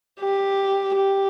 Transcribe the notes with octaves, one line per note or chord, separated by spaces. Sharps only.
G4
G4